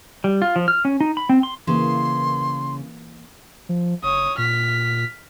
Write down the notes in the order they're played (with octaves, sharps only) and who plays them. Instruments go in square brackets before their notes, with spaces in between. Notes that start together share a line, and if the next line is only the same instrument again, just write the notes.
[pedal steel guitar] G3
F4
F3
F6
C#4
D#4
B5
C4
C6
[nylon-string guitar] C#3 [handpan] E3 A#3 [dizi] C6
[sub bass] F3
[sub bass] F#1 [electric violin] C#5 D#6
[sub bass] A#2 [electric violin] F6 B6